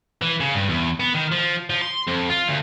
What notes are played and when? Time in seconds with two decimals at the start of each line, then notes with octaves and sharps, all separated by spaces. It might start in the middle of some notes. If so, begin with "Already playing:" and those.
0.22 E3
0.40 C#3
0.55 G2
0.69 E2
1.00 B3
1.15 D#3
1.32 F3
1.70 F3
1.82 C6
2.08 F2
2.30 F4
2.48 D2